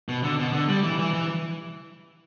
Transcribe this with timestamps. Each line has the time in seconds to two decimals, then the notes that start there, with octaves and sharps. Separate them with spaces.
0.09 B2
0.23 D3
0.39 B2
0.53 D3
0.69 G3
0.84 E3
0.99 E3
1.14 E3